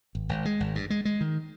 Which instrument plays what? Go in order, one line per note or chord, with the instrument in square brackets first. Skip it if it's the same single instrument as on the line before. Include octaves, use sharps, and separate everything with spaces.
[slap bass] G#1
G#1
G#3
G#1
G2
G#3
G#3
D#3